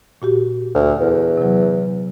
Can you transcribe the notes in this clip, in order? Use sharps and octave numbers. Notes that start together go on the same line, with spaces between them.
A#2 F#4 G4
D2
E2
C3 F#3